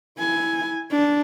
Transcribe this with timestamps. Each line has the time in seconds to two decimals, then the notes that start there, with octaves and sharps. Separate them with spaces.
0.19 E4 G#5
0.91 D4